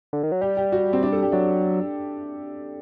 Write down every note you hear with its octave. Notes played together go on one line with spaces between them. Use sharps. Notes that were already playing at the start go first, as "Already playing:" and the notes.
D3
D#3
F#3
G3 G4
G4
F#4
C4
D4
A4
G4
F#3 D4